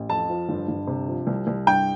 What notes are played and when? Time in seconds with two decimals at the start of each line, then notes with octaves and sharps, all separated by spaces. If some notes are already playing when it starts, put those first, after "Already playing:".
Already playing: A1
0.09 F2 A5
0.30 F3
0.49 G1
0.68 G1
0.88 C3
1.08 F3
1.27 C2
1.47 C2
1.66 G2 G5